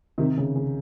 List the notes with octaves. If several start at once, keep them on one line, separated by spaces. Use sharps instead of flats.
C3 D#3
C#3
C#3